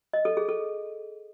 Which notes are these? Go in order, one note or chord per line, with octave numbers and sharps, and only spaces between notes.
D#5
A4
G#4
A4